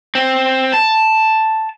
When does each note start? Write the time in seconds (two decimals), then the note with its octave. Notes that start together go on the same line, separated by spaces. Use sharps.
0.15 C4
0.74 A5